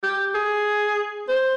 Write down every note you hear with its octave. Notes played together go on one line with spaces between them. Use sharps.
G4
G#4
C5